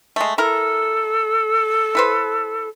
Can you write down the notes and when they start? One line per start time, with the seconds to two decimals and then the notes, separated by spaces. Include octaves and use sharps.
0.16 G#3 A3
0.38 E4 A4 A#4
1.95 E4 B4 C5